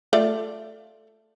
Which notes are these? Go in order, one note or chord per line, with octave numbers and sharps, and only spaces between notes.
A3 F4 D5